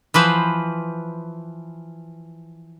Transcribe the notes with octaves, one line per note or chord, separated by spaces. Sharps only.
E3 F3 B4 C5